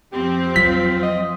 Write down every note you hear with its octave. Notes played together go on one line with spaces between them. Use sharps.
F2 F3 C4 G4
F#3 F4 B6
D#5